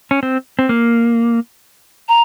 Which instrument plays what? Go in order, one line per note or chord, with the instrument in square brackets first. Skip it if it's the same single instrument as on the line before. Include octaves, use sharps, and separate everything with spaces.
[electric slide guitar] C#4
C4
C4
A#3
[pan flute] A#5